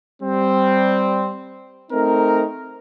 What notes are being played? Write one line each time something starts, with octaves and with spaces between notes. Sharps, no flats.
G3 C4
A3 C4 D#4 A#4